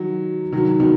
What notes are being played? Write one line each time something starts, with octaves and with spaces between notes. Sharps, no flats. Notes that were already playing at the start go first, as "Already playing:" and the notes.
Already playing: D#3 F#3
D#3 F#3
B2 D#3